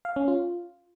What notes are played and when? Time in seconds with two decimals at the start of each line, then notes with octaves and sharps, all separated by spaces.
0.05 F5
0.16 C#4
0.28 F4